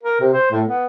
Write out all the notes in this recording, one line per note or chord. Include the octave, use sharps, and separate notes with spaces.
A#4
C3
C5
A2
B3